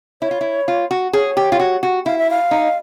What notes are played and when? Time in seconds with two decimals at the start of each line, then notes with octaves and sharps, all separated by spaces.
0.22 E4 C#5
0.31 F4
0.41 E4
0.68 F4
0.91 F#4
1.13 G#4 C#5
1.37 G4
1.52 F4
1.60 F#4
1.83 F#4
2.06 E4 F5
2.18 E5
2.30 F5
2.51 D#4